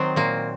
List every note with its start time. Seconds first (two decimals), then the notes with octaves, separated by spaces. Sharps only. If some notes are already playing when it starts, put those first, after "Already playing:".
Already playing: D#3 F#3 C4
0.16 A#2 A#3